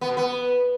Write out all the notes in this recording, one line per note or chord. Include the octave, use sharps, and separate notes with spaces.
B3
B2
B3